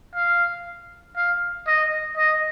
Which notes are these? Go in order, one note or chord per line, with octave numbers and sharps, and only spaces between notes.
F5
F5
D#5
D#5